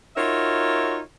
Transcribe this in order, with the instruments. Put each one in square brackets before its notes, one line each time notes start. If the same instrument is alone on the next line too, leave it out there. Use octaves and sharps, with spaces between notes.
[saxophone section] D#4 F4 F#4 A#4 C#5 E5